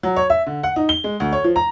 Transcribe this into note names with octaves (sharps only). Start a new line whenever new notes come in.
F#3
C#5
E5
D3
F#5
D#4
G7
G#3
D2
C#5
F3
A#5